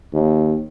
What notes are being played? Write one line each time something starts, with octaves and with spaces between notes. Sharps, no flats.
D#2